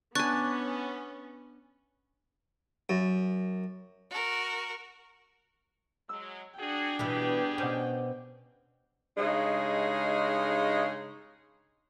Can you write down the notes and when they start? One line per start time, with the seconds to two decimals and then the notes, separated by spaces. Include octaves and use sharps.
0.15 B3 C#4 D4 G#5 C#6 F#6 A6
2.89 F#2
4.10 F#4 A#4
6.09 F#3 G#3 E6
6.59 D4 F#4 G#4 G5
6.99 B2 E3 G3 B3 G4 G#4
7.58 B2 C#4 C5 D6
9.18 G2 C#3 G#3 D#4